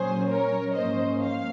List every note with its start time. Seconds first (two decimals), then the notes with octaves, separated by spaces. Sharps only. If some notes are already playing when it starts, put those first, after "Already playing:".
Already playing: A#2 F#3 C#4 G#4 C5
0.28 A#4 C#5
0.75 G#2 F3 A#3 C#4 C5 D#5
1.22 F5